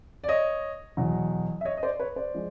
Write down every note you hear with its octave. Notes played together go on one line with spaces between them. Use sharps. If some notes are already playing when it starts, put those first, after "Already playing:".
D5
C#5 D#5
E2 B2 F#3
E5
C#5 D#5
D#5
C5 D5
B4 C#5
C5 D5
F3 G#3